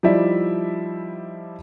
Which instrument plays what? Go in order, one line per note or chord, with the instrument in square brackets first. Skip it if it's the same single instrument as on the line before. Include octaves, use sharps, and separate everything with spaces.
[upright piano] F3 G3 D#4 E4 D5 E5